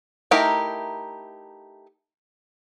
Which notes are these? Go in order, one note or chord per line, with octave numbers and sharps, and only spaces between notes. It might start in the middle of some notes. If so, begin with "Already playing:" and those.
A3 D#4 E4 G4 A#4